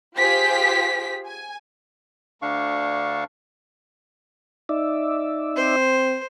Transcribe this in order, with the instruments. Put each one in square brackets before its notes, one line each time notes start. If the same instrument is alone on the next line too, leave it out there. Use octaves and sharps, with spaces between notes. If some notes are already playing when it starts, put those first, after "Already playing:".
[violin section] F4 G4 G#4 C5 B6
G#5
[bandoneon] D2 D3 D4 F5 C#6
[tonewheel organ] D#4 D5 E5
[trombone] C4 [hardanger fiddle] C5